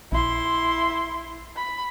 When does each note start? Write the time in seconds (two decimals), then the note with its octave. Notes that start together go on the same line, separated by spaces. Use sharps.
0.12 A#1 E4 C6
1.56 B5